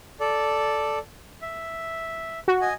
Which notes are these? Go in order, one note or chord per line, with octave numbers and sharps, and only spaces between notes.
A4 D5
E5
F#4
D#5 G#5